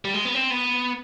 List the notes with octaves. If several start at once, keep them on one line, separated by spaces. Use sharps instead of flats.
G3
G#3
B3
C4
B3